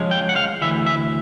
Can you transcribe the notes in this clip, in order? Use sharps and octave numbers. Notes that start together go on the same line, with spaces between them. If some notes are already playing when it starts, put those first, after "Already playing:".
Already playing: F3 G#3 C#4
G5
F#5
F5
D2 C#3 E3 E5
E5